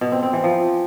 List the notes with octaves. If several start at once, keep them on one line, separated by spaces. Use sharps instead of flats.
B2
C4
C4
E3
F3